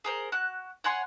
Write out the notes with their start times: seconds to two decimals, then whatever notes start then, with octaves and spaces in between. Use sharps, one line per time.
0.04 G#4 A#4 C5
0.32 F#4 F#6
0.84 C#5 F#5 G#5 C6